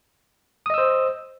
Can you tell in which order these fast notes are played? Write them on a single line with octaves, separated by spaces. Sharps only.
D#6 D#5 E6 C5